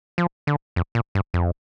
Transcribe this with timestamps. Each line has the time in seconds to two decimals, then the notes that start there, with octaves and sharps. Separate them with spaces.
0.18 F3
0.47 D3
0.76 F2
0.95 A#2
1.15 G2
1.34 F2